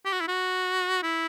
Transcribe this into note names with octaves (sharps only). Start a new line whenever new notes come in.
G4
F#4
E4
F#4
E4